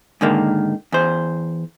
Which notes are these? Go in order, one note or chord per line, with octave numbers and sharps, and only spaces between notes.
G#2 D3 D#3 A#3
E2 C5